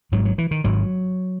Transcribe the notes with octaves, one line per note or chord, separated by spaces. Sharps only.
G#1 G#2 F#3
F#3
E3
D#3
G#1 G#2 F#3